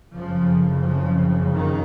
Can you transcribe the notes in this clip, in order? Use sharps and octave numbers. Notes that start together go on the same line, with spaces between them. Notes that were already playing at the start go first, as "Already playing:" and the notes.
F#1 F2 C#3 F3
F3
D#3